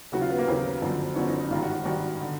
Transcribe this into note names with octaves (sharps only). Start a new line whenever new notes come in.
D#2 C#3 F#3 F#4
F4
B3
A#3
D#2 C#3 F#3 C4
G1 F#2 D3 F3
G1 F#2 D3 F3 C#4
D#4
D#4
G#1 G2 D#3 F4
F#4
F#4
G#1 G2 D#3 F#4
D3